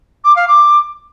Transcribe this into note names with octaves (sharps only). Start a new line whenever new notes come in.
D6
F5
D6